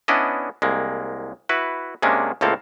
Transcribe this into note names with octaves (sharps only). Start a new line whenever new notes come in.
B3 C#4 D4 E4 D5 D#5
C2 G#3 A#3
E4 F#4 B4
C3 G#3 A#3 C#4 D4
C#2 A2 A#3 C4 A4 F5